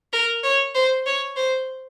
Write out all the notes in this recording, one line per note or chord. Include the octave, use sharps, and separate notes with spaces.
A#4
C#5
C5
C#5
C5